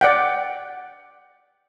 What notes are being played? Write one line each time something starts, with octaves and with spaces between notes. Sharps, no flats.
D5 F#5 G5